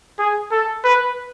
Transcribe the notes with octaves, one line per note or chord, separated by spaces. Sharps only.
G#4
A4
B4